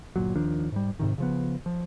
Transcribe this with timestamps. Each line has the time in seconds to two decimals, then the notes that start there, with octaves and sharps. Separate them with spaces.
0.16 G1 A#2 F#3
0.36 D#2 D#3 F3 D4
0.72 G#2 G3
1.00 G#2 C3 D#3
1.18 C#3 F3 B3
1.66 F3